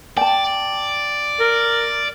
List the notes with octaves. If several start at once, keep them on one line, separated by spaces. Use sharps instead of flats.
D5 G5 A5
A#4